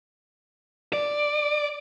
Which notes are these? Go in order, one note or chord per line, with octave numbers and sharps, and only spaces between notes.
D5